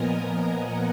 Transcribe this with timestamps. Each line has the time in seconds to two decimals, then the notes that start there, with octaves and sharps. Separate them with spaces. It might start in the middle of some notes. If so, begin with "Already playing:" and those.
Already playing: A#2 F3 B3 A#4 D#5 G#5 A#5
0.16 G#5
0.49 F#5